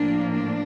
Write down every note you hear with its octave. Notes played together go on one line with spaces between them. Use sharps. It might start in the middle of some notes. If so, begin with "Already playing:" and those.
Already playing: A2 F3 A#3 D4
D4